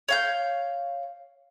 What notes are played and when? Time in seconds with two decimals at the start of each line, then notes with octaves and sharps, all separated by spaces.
0.09 C#5 F5 G6